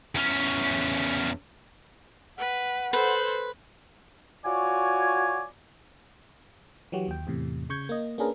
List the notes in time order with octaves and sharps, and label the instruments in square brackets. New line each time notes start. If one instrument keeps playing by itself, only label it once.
[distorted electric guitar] E2 C#4
[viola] B4 [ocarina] F#5
[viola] A4 C5 [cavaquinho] B4
[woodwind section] F4 F#4 C#5 D5 G#5
[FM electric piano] E3 F#3 F#4 G4
D#2 G5
E2 A2 C3
C#3 C#6 G6 G#6
A#3 D#5
A#3 C#4 D4 G#4 A#4 B4